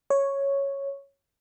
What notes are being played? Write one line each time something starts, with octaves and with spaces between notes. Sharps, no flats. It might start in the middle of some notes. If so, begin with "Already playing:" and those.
C#5